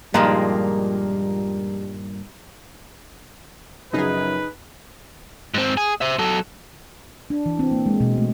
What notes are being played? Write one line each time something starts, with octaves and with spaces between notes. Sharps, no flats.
G2 A#2 D#3 F3 G3 G#3 A#3
F#2 C#3 F3 D#4 G#4 B4
G#2 C4
G#4
C5 E5
F#3 A4
D4
E3
C4
A#3
G#3
B2
A3